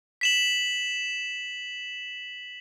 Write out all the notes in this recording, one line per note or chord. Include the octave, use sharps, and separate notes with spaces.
B6 E7 F#7